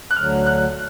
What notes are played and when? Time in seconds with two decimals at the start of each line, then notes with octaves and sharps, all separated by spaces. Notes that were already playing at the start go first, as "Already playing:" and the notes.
0.11 F#6
0.16 D2 D3 F#3 F6
0.46 F#6